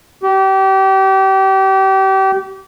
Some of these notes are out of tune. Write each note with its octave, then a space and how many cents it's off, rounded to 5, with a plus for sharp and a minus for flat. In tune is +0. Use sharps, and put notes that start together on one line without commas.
G4 -30